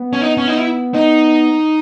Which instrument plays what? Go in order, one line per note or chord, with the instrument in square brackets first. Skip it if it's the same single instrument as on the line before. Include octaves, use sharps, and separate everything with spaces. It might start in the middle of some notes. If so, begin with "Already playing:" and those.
Already playing: [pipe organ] B3
[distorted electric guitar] C#4
D#4
C#4
D#4
E4
D#4